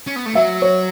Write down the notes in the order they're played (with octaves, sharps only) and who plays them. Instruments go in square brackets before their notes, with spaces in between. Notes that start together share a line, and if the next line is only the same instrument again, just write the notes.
[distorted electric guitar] C#4
B3
A3
[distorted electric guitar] F#3 [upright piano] E5
[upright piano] C#5